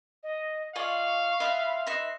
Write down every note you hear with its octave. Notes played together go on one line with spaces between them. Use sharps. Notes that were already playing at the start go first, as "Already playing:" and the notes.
D#5
F4 D5 D#5 F5 G#5 C#6
E4 F4 D#5 E5 F#5 B5
D#4 B4 E5 C6 A#6